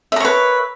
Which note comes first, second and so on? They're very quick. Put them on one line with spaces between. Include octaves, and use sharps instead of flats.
E5 A#4 C#5 B4